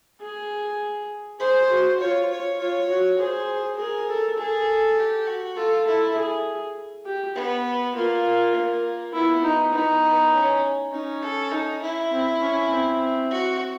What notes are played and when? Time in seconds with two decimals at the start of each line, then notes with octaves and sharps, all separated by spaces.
0.21 G#4
1.39 G#4 C5
1.70 F#4
1.99 F4 C#5
2.30 C#5
2.59 F4 C#5
2.88 F#4
3.19 G#4 C5
3.78 G#4 A#4
4.08 A4
4.37 G#4 A4
4.97 G4
5.27 F#4
5.56 F4 A4
5.87 E4 A4
6.16 G#4
7.05 G4
7.35 B3
7.95 A#3 F4
8.55 A#3
9.13 B3 E4
9.44 D#4
9.73 B3 D#4
10.03 B3
10.33 C#4
10.92 C#4 D#4
11.22 A4
11.51 D#4
11.82 E4
12.12 C4
12.41 C#4
12.71 C4
13.31 F#4